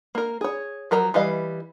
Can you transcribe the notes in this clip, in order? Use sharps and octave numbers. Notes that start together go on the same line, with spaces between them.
A#3 A#4
G#4 C#5
F3 F#3 A#4 A#5
E3 G3 B4 D#5 F5